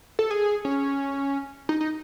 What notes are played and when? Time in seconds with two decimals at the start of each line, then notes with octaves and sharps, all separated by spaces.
0.19 A4
0.31 G#4
0.65 C#4
1.69 D#4
1.81 D#4